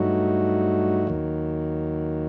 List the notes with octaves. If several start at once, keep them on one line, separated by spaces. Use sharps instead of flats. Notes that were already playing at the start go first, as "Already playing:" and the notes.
Already playing: G2 F#3 A3 D#4 F#4
D#2 D#3 F#3